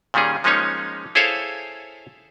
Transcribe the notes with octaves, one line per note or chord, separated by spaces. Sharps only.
A#2 D#3 G3 C#4 G#4
F3 G#3 A#3 C#4 D#4 C#5
E4 G#4 A4 C5 C#5 F5